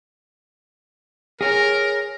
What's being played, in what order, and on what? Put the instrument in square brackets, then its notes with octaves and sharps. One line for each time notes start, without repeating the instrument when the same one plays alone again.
[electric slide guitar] G#4 C#5 G#5 [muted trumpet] A#4